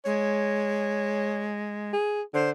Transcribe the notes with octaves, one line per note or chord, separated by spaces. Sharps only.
G#3 C#5
G#4
D3 C5